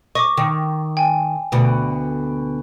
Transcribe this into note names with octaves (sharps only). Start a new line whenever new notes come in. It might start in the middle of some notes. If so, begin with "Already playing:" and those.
D#5 C#6 D6
D#3
G5 G#5
D2 B2